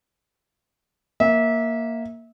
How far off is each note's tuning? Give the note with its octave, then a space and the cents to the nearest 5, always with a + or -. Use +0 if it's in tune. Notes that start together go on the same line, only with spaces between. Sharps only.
A#3 +0 E5 -25